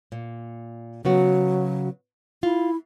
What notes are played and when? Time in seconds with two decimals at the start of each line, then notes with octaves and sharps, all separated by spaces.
0.12 A#2
1.05 C#3 F#3 B3 F#4
2.43 E4 F4